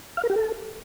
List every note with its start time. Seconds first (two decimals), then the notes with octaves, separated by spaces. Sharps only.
0.17 F5
0.23 A#4
0.30 G4
0.36 A4